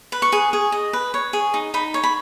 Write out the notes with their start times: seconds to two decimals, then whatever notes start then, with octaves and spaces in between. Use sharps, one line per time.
0.12 B4
0.22 C#6
0.32 G#4
0.53 G#4
0.72 D#5
0.93 B4
1.14 C#5
1.33 G#4
1.54 D#4
1.74 D#4 B5
1.94 C#5
2.03 B5